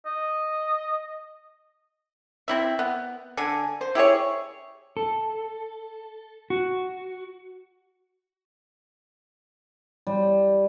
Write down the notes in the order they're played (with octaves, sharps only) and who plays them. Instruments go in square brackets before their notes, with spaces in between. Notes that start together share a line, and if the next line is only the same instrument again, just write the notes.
[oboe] D#5
[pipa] C4 E4 E5
B3
D3 G#5
C5
E4 G4 G#4 C#5
[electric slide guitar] A4
F#4
[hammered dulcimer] G3